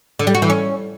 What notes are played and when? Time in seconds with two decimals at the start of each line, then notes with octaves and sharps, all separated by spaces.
0.19 D3
0.27 G3
0.34 F#4
0.42 E3
0.50 C#4